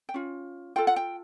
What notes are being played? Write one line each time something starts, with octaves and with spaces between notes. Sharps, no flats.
G5
C#4 F4
F4 A4 G5
F#5
G5